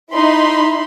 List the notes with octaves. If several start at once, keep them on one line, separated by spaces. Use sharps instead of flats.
D#4 E4 B5 C6